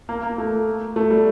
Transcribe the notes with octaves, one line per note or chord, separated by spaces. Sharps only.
A#3
A#3
A3
A3
G3